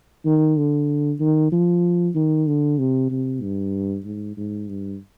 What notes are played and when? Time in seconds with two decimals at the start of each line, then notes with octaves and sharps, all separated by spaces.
0.25 D#3
0.57 D3
1.20 D#3
1.52 F3
2.15 D#3
2.47 D3
2.78 C3
3.11 C3
3.42 G2
4.05 G#2
4.37 G#2
4.68 G2